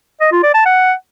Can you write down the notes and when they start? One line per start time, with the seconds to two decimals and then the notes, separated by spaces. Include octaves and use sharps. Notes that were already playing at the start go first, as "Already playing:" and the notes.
0.21 D#5
0.32 F4
0.43 D5
0.54 A5
0.66 F#5